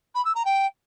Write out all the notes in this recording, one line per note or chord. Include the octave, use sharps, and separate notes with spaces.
B5
E6
A#5
G5